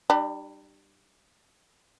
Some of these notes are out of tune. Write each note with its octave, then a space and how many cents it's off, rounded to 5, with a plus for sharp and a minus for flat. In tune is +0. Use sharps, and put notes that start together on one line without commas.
G3 -5 D4 +40